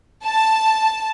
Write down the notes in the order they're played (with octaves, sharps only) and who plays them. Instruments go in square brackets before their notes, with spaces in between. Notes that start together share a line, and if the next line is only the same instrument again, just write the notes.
[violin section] A5